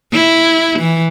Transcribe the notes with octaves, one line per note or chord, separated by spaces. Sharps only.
E4
E3